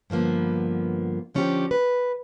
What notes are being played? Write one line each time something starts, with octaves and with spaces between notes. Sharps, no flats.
G2 D3 F3 A#3 B3
D3 F3 C#4 D4 F#4 G4
B4